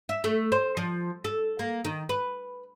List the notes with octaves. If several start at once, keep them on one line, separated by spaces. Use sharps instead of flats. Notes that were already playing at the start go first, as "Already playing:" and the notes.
E5
A3
C5
F3
A4
A#3
D#3
B4